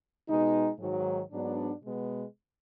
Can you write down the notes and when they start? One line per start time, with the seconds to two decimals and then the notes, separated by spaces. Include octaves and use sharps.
0.28 B2 G#3 D#4
0.79 G#2 D#3 F#3
1.31 G#2 F#3 B3 D4
1.82 B2 G#3 B3